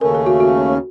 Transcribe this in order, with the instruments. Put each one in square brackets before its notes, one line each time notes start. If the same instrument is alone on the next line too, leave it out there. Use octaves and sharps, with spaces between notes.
[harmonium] D#2 C#3 A3 C#4 [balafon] A#4
[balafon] A4
F#4
F#4